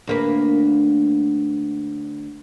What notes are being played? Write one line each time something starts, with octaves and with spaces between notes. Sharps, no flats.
D2 A#3 B4